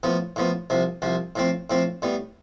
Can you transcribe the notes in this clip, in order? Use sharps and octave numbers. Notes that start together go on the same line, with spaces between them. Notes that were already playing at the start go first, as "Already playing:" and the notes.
A2 F3 B3
A2 F3 B3
C2 C3 F3
C2 C3 F3
A2 F3 C4
A2 F3 C4
A2 G3 B3